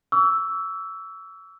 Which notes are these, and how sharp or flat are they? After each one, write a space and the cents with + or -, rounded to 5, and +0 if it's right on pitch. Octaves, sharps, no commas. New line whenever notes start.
C#6 +45 E6 +0